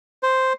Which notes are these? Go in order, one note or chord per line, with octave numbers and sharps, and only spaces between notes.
C5